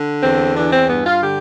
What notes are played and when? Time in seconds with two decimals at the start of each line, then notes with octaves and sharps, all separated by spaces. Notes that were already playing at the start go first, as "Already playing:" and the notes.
Already playing: D3
0.22 E2 C4
0.56 E3 D4
0.73 C4
0.89 G2 B3
1.06 F4
1.22 D3 G4